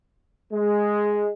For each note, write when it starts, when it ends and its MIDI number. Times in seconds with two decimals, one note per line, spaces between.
0.51 1.28 56